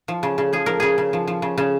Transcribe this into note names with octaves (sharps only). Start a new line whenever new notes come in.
F3
C#3
C#3
F3 G#4
F3 A#4
C#3 G#4
C#3
F3
F3
C#3
C#3